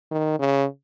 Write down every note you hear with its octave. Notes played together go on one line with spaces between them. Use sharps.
D#3
C#3